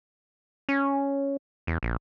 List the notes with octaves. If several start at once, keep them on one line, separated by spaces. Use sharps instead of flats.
C#4
E2
A#1